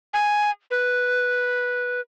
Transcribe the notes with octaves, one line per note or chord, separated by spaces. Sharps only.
G#5
B4